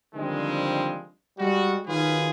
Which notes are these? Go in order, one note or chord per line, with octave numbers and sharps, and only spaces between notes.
D3 D#3 F3 G3 G#3 C4
G3 G#3 F#4
D#3 F#3 D#4 F4 G#4 B4